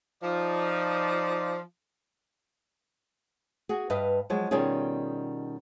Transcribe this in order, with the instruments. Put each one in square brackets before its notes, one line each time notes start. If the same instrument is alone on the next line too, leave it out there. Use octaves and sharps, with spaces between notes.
[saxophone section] F3 [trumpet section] D#4 D5
[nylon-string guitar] F#4 G#4
G2 B4 D#5 F5
F3 F#3 G#3
B2 D#3 G3 C#4 F4 G#4